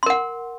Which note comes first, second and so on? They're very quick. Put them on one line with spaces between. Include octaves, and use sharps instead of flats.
C6 A#4 F#5